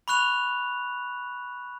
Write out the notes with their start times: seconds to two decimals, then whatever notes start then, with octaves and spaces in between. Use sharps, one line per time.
0.08 B5 C#6 F#6 F7